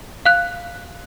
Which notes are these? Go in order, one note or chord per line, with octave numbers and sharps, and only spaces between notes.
F5 F#6